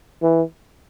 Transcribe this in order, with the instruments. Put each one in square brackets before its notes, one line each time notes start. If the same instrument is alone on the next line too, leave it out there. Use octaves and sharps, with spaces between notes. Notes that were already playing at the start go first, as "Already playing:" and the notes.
[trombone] E3